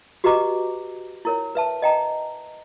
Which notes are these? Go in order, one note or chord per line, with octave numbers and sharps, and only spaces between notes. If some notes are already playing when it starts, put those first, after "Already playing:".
F#4 G4 B4 D#5 A#5 D6
E4 A#4 C#5
B4 E5 A5
D#5 G5 A#5